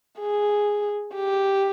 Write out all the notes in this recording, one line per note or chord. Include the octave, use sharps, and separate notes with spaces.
G#4
G4